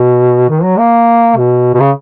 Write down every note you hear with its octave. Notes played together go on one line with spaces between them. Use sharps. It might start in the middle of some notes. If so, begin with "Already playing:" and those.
Already playing: B2
D#3
F#3
A#3
B2
B2
C#3